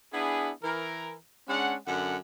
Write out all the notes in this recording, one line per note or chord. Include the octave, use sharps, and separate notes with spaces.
B3 D4 E4 G#4
E3 A#4
G#3 C#4 D4 F#5
F#2 D3 F#5